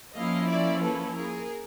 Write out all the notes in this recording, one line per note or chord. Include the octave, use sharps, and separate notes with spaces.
F3 A#3 C#4 E4 D#5 F5
D5 E5
A4 B4
G#4 A#4